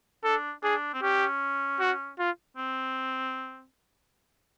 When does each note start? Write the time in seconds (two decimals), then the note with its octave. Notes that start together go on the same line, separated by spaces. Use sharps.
0.24 D4 A4
0.63 D4 G#4
0.94 C4
1.02 C#4 G4
1.80 F#4
2.19 F4
2.57 C4